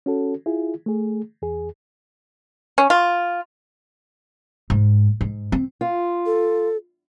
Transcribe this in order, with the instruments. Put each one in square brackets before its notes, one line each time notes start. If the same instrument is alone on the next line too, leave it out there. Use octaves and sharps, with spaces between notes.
[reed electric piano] C#4 F#4 A4
E4 F4 G#4
A3 G#4
E2 G#4
[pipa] C#4
F4
[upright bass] G#2
G#2
C4
[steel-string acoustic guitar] F4
[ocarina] A4